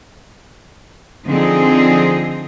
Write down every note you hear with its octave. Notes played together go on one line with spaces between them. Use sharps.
D3 F3 C4 D#4 G#4